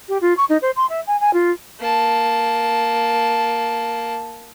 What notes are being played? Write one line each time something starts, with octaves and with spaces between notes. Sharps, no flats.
G4
F4
C#6
D#4
C5
C6
E5
G#5
G#5
F4
A#3 A5